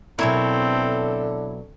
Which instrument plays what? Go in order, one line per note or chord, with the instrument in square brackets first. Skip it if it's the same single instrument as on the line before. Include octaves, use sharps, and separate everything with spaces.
[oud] B2 F#3 A#4 [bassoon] D3 [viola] C4 A4 [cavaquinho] E4 C#5